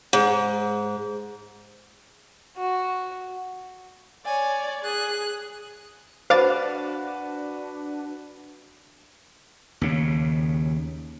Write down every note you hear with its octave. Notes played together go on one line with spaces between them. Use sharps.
G#2
F#4
C#5 D5 G#5
G#4 F#6
D4 F#4 B4 C5 F5 D6 A6
D#2 C#3